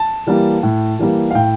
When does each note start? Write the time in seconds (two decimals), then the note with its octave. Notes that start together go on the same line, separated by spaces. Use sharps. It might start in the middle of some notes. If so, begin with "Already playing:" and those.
Already playing: A5
0.27 E3 G3 A#3
0.63 A2
0.99 E3 G3 A#3
1.31 F5
1.35 A2 G5